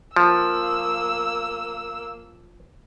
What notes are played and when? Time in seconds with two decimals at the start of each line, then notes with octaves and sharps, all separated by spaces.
0.16 F3 A#3 E6